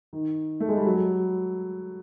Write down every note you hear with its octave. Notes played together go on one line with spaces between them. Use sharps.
D#3
A3
G#3
G3
F#3